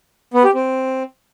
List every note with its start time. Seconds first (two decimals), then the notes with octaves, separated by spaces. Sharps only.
0.34 B3
0.44 G4
0.54 C4